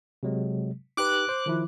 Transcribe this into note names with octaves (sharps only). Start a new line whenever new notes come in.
C3 F#3 G#3
D#4 G4 B4 D6 F#6
C5
D#3 F3 E4